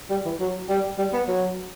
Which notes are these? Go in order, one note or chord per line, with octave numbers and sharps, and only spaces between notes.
G3
E3
F#3
G3
G3
B3
F#3